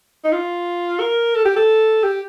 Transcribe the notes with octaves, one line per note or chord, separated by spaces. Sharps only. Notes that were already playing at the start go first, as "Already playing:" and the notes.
D#4
F4
A#4
A4
G4
A4
G4